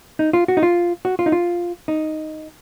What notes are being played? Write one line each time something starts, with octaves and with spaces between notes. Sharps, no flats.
D#4
F4
F#4
D#4
F4
F#4
F4
D#4
F4
D#4